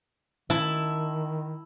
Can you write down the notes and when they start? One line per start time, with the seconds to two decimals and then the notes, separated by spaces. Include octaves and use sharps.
0.50 D#3 E4 A5